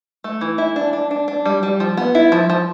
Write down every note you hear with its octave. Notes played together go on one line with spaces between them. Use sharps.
A3
E3
E4
D4
D4
D4
D4
G3
G3
F3
B3
E4
F3
F3